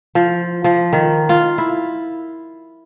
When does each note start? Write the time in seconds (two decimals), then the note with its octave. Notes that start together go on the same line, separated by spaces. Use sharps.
0.15 F3
0.64 F3
0.93 D#3
1.29 F4
1.58 E4